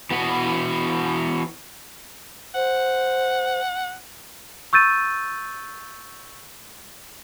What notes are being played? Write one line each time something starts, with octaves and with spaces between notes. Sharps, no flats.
E3 B3 F#4 B4
C5 F#5
C#6 E6 G6 A6 D#7